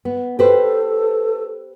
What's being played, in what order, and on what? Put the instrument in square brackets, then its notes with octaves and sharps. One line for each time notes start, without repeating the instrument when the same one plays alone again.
[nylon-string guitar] B3
[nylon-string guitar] G4 B4 C5 [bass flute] A4